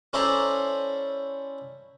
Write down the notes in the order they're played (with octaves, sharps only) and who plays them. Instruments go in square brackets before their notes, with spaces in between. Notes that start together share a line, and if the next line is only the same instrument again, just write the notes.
[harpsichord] C#4 E4 A4 C5 D5 A#5